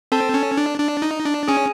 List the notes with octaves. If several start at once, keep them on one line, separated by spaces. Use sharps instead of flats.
C4 A4 A5
C#4
D4
D4
D#4
D4
C#4 G#4 G#5